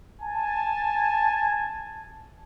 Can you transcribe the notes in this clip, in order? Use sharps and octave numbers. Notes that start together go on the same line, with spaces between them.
G#5 A5